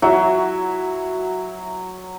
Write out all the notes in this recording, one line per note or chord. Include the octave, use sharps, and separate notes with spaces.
F#3 E4 F#4 E5